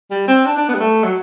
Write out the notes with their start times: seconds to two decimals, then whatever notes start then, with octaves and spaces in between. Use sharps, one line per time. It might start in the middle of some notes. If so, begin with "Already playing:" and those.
0.11 G3
0.28 C4
0.46 D4
0.57 D4
0.69 B3
0.75 G3
0.80 A3
1.04 F#3